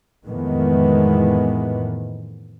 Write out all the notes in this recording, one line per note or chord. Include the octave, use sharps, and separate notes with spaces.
F2 A2 D#3 E3 G#3 B3